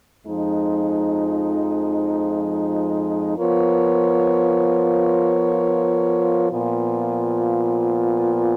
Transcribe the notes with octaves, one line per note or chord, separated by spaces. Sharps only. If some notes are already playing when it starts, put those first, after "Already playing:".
F2 F3 G#3 D#4
F3 B3 F4 A#4 C#5
A#2 F3 B3 F4